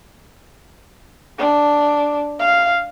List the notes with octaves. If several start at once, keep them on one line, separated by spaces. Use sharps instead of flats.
D4
F5